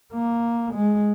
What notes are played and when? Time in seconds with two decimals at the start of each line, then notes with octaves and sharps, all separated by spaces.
0.14 A#3
0.74 G#3